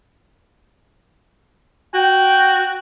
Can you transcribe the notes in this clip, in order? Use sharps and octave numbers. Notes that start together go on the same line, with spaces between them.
F#4 G5